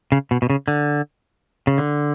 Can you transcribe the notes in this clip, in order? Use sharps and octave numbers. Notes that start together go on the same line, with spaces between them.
C#3
B2
B2
C#3
D3
C#3
D3